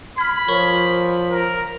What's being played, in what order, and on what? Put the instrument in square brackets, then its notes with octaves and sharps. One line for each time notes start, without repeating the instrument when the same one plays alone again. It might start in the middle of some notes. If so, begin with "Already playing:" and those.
[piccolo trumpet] B5 [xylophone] F6 G#6
[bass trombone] F3 [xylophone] A#4 C#5 C#6
[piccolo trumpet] A#4